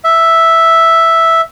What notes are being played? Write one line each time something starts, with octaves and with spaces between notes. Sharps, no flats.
E5